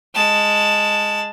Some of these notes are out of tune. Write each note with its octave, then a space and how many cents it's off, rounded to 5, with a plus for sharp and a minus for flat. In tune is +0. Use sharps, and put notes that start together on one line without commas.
G#3 +0 A5 +0